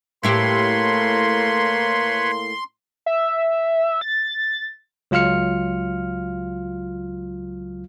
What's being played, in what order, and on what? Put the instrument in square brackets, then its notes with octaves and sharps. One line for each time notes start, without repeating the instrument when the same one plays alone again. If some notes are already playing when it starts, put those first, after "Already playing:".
[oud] A2 E4 G4 [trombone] A#3 [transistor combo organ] B4 C#5 [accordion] C6
[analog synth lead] E5
A6
[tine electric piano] C#2 F#3 F4 F5 F6 C#7